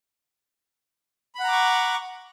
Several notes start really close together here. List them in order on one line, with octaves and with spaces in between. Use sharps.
B5 F#5 A#5 D6 C#6